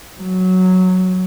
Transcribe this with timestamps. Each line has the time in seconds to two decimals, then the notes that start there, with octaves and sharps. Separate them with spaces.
0.21 F#3